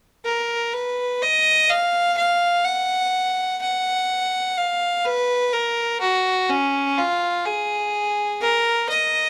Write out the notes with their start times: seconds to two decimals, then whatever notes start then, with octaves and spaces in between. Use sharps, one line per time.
0.25 A#4
0.73 B4
1.22 D#5
1.70 F5
2.17 F5
2.65 F#5
3.62 F#5
4.57 F5
5.04 B4
5.53 A#4
6.00 F#4
6.49 C#4
6.97 F4
7.45 G#4
8.40 A#4
8.89 D#5